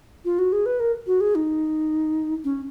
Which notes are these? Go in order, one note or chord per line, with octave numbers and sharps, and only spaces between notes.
F4
F#4
G#4
B4
A#4
F#4
G#4
D#4
C#4